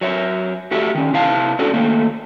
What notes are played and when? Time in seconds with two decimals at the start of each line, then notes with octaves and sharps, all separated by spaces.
0.01 F#3 C#5 E5
0.71 A3 F#4 G4 A4 E5
0.95 D#3 C#4
1.13 C3 E4 F5 A5
1.59 C#4 D4 F#4 A4
1.74 D#3 A3 A#3